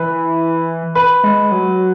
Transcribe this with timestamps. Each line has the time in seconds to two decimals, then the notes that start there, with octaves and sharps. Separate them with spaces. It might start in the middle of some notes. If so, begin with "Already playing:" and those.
Already playing: E3 B4
0.95 B4
1.24 G#3
1.52 F#3